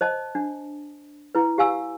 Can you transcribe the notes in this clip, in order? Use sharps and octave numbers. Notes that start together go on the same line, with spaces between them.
C5 D#5 A5
D4
E4 B4
G4 F5 G#5 E6